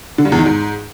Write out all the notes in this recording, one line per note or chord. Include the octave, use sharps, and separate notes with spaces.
D3
G2
E2
D#3
G#2